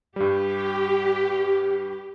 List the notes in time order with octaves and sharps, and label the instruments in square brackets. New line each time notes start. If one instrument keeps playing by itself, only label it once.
[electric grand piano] G2 G3 [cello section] G4